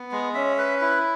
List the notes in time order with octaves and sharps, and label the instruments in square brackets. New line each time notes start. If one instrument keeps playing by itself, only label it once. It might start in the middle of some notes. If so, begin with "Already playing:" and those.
Already playing: [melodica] B3
G#3
[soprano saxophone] C#4 [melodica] E5
[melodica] B4
E4